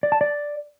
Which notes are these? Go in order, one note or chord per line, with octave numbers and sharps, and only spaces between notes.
D5
A5
D5